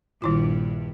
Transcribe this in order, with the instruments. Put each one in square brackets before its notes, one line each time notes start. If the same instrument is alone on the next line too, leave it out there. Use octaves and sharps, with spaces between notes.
[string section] A#1 G2 [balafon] D#3 E4 F4